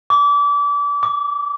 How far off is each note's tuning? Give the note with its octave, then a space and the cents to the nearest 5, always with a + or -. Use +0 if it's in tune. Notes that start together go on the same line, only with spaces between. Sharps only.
D6 -30
D6 +10